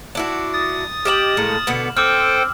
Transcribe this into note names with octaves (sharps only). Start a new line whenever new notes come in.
D4 E4 F#4
D#6 A6
G4 D#5 G5 F6 E7 F#7
A2 G#3 A#3
B2 D3 B3
C4 A4 C5 G5 D6 E6 F6